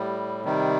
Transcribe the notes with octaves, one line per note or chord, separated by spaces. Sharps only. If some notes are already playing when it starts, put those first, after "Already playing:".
Already playing: A2 G3
C3 D#3 G3